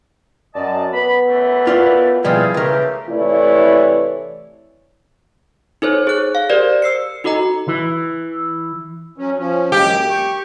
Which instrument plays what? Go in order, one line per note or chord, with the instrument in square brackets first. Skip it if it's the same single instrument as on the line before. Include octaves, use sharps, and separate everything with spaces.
[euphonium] F#2 [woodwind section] D5 D#5 A5
[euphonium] B3 [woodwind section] B5
[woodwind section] F#2 E3 A3
[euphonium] B3 [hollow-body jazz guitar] F4 D5
[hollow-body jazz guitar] B2 F3 G3 [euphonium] E3 [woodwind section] E4 G#4 F5
[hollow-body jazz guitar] C#2 A#4 [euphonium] C#3 [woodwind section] E3 A3 G4
[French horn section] C3 E3 A3 E4 C#5 D5
[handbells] D#4 A4 C5 C#5
G#4 F#6
F5
G4 A#4 C5 D5
E6 C7 C#7
D#4 F#4 A4 D#5 A#5
[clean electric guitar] E3
[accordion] F#3 C#4
F3 C#4
[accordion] F#2 G#3 A#3 [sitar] G4
[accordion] C#6